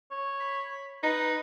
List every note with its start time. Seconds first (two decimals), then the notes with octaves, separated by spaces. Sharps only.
0.11 C#5
0.40 B5
1.03 D#4 B4